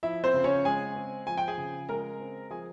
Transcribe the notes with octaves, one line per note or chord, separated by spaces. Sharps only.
F3 E4 E5
C4 C5
C#3
C#4 C#5
G#3 G#4 G#5
C4
F3 G#5
G5
G#4 G#5
C#3
G#3 A#4 A#5
C4
F3 G#4 G#5